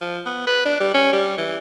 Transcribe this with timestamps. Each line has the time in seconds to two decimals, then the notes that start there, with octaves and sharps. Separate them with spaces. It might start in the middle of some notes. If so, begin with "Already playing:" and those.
0.01 F3
0.26 B3
0.47 B4
0.65 D4
0.80 G3
0.94 C#4
1.13 G3
1.38 E3